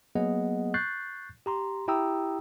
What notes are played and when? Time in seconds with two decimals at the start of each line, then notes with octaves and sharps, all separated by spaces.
0.15 F#3 A#3 B3 G#4 D#5 F#5
0.74 C#6 F#6 G6 A6 C7
1.46 G4 A#5 C6
1.88 E4 G4 G5 A#5 D#6 E6